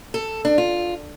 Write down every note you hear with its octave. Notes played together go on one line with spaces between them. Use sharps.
A4
D4
F4